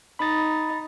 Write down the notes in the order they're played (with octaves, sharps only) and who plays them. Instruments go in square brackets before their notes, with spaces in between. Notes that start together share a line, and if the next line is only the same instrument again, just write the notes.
[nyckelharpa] D#4 [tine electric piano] B5 A6